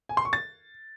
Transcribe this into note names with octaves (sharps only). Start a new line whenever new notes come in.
G#5
C6
C#6
A6